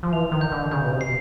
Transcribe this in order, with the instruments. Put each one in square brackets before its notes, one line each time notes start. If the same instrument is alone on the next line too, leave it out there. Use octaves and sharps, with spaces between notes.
[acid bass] F3
[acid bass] E3 [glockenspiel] F7
[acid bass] D#3
[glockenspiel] G6
[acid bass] D3
[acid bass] C#3 [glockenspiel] G6
[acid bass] B2
C3
[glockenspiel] C7